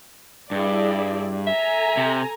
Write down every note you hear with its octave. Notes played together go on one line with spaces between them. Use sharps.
G2 E4 G#4 D5
A4 E5 G#5 A#5
C3